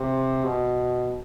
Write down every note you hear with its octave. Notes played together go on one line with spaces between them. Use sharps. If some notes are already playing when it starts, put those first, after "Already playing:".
Already playing: C3
B2